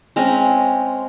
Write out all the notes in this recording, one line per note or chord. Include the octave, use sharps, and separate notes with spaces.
G#3 C4 C#4 A#5